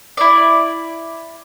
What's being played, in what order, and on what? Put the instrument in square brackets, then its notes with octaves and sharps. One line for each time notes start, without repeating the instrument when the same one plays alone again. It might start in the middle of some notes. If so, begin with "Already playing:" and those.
[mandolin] E4 D5